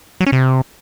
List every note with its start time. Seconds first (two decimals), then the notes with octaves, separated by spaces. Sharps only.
0.21 F#3
0.27 C#4
0.32 C3